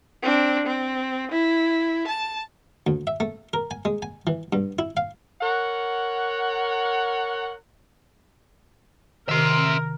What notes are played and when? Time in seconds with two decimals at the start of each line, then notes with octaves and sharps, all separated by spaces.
0.23 C4 D4
0.66 C4
1.31 E4
2.07 A5
2.87 D2
3.07 E5
3.20 A3
3.53 A#4
3.71 G#5
3.85 G#3
4.02 G#5
4.27 E3
4.53 G2
4.79 E4
4.97 F5
5.41 A#4 C#5 F#5
9.29 C3 D#3 A#4 E5 C6